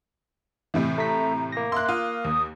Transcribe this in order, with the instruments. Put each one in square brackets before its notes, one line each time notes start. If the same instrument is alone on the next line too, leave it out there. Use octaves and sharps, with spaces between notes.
[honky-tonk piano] A2 C3 E3
[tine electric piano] A3 B6 [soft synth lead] A#5
[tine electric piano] A#3 A#6
[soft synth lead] E5 [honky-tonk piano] C6 F#6
[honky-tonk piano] F4 [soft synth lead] D#6
[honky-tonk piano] D#2